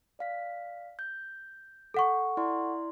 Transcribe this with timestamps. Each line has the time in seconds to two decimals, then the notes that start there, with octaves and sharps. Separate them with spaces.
0.19 D5 F5 B6
0.99 G6
1.94 A4 F#5 C#6
2.37 E4 D5 C6